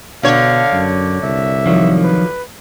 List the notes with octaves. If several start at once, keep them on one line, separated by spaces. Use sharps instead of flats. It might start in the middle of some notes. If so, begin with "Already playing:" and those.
B2 D3 C#5 F5
F#2
C2 E5
D#3 F3 F#3
B4